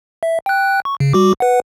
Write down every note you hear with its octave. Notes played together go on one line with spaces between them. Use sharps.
E5
G5 F#6
C#6
C#3
G3 F#4 D6
B4 F#5